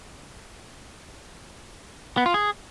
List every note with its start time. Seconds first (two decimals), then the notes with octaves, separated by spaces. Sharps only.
2.17 B3
2.26 F4
2.34 G#4